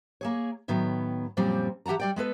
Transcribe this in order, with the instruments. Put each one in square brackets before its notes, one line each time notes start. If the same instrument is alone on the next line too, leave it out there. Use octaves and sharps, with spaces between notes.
[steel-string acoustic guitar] A#3 G#4 C#5
A2 D#3 F#3 B3
F#2 A#2 F3 G3 C4
E3 G4 F#5 A5 A#5
G3 D5 G5
G#3 B3 A4 B4